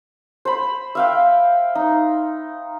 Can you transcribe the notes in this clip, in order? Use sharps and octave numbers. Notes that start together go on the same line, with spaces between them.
C5 B5
E5 F5 G5
D#4